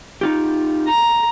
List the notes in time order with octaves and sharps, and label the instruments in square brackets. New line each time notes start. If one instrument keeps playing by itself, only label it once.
[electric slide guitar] D#4 F4 G4
[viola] A#5